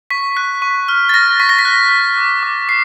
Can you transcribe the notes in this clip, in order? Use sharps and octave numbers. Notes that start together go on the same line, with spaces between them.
C#6 B6
F#6 B6
C#6
F6
A6
F6 A#6
C#6 B6
A#6
B6
F#6
F#6
D6
D6
D6 C7